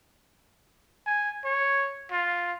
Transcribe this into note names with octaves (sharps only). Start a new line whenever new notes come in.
G#5
C#5
F4